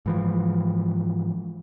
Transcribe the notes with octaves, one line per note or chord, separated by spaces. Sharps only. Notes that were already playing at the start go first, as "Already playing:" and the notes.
G#2 E3 F3